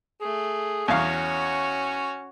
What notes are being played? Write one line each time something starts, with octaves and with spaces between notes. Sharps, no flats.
A3 G#4
E2 C#4 F#4 C#5 F5